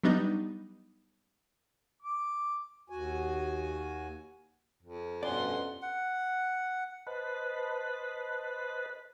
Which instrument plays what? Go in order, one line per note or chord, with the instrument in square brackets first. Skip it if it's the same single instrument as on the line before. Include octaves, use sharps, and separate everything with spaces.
[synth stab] F#3 G3 B3 D4 D#4
[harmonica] D6
[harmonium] D#2 F#4 G#5
[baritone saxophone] F2
[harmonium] G2 B2 C#4 [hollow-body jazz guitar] D5 [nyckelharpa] F#5 C6
[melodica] F#5
[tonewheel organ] B4 C5 D#5 A5 B5 F#6